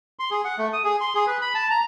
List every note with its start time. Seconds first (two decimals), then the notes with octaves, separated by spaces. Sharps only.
0.19 C6
0.31 G#4
0.45 F#5
0.58 A3
0.73 D#6
0.84 G#4
1.01 C6
1.15 G#4
1.27 B4
1.41 B5
1.54 A5
1.71 A#5